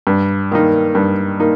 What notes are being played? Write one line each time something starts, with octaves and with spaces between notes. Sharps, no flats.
G2
D#3 A#3 D#4
G2
A#3 D#4